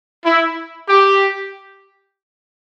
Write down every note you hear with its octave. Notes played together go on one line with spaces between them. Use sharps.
E4
G4